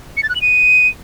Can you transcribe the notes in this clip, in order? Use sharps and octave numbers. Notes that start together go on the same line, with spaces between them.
C#7
A6
F#6
F#7
D#7